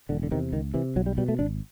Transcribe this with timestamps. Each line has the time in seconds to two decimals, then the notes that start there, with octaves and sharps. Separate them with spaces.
0.09 E1 D3
0.23 D3
0.31 E2 C3 D#3
0.52 C#2 D#3
0.74 C3 E3
0.96 B1 F#3
1.06 G3
1.18 B2 G3
1.28 A3
1.39 G#1 D4